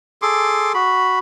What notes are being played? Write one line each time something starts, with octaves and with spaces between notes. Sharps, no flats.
G#4 A4 C6 D6
F#4 B5